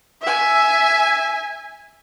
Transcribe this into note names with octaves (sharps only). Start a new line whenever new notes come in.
E5 G#5